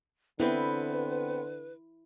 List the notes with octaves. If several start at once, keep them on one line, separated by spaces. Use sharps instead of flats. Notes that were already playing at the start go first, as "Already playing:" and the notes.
D3 B3 C4 E4 B4 C5